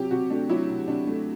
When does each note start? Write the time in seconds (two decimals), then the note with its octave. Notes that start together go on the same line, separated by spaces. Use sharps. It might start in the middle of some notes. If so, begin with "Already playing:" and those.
Already playing: C3 F#3 G4
0.11 C3 F#4
0.30 A3 D4
0.49 F#3 E4
0.69 C3
0.88 C3 D4
1.07 A3